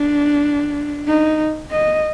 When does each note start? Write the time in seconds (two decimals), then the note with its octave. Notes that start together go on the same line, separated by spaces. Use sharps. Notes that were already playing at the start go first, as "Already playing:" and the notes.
Already playing: D4
1.07 D#4
1.71 D#5